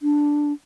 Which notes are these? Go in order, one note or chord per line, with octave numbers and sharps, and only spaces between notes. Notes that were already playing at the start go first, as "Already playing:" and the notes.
D4